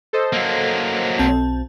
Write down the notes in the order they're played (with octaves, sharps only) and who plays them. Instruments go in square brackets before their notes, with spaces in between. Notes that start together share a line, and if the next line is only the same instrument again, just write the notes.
[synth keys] A4 C5 D#5
[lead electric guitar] F#3 A#3
[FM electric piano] B1 C4 A5